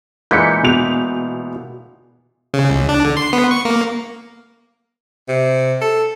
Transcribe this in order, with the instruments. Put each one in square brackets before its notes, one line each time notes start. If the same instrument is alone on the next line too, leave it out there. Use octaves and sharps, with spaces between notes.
[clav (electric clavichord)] A#2 E3 G#3 [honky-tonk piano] G6 B6 C#7
[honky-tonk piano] B2 F7
[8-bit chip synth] C#3
C#2
D4
D3
C6
B3
C#6
A#3
[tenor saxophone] C3
A4